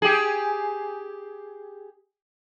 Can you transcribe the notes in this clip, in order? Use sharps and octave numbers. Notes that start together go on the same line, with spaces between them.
G4 G#4